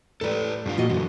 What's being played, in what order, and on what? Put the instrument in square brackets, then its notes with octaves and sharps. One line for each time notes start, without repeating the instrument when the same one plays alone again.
[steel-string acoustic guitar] A2 G3 [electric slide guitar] A4 B4
[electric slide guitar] G2 D4 F4
[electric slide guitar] A#2 [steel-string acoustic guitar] F4 F#4 D#5
[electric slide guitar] F#2 D3 E3 [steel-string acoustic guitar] F#4